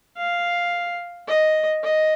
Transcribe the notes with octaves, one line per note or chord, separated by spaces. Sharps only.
F5
D#5
D#5